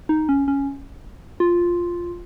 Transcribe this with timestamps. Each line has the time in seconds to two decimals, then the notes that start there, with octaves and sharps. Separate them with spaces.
0.09 D#4
0.29 C#4
0.48 C#4
1.40 F4